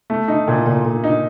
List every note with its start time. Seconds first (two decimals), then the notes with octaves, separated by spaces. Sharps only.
0.10 A3
0.28 D#4
0.48 A#2
0.66 A#2
0.85 A#2
1.04 D#4